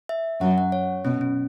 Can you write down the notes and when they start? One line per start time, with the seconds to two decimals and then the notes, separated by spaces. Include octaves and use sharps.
0.09 E5
0.41 F#2 F#3 F#5
0.58 F#5
0.72 C#5
1.05 B2 C#4
1.21 C#4